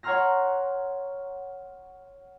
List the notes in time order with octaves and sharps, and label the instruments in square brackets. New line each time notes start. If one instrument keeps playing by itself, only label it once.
[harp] C#5 F#5 A#5 C6 F6 A#6